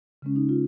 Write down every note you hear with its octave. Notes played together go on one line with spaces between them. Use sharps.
C#3 G#3 C#4
D#4
F4